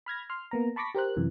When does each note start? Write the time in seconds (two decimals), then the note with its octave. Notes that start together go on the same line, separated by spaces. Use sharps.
0.06 B5 F6 G#6 A#6
0.30 C6 F6
0.51 A#3 B3 A#5
0.76 A5 B5 C#6 D6 A#6 B6
0.95 G4 A#4 C5 F#6
1.17 F#2 C3 E3